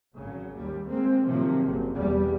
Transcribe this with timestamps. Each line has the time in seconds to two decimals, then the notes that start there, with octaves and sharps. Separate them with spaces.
0.15 G#1 C#3 F#3
0.54 D#2 G3
0.87 G#3 A#3 C4
1.25 C3 D#3 F3 F#3 A#3
1.65 F#1 C3
1.96 E2 B2 G3